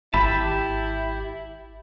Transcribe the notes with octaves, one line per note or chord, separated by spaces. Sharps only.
G#1 E4 G4 E5 A5 B5